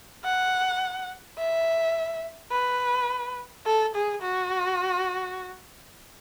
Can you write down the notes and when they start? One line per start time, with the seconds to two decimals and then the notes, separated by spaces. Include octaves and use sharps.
0.24 F#5
1.38 E5
2.52 B4
3.66 A4
3.95 G#4
4.22 F#4